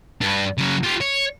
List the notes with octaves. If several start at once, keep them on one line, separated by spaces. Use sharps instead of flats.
G2 D4
C#3 F#3
F4 G4
C#5